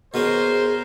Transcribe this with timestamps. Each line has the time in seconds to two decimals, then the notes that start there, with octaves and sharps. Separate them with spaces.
0.14 B2 B3 C#4 G#4 A#4 C5